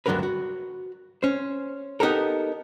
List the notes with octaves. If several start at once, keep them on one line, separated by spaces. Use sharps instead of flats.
D2 G2 F#3 D4 A#4 B4
F#4
C#4 C5
B3 D#4 G4 A4 A#4